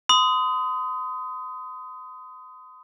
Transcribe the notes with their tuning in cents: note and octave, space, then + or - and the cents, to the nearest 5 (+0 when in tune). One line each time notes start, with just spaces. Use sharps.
C6 -40 D#6 +10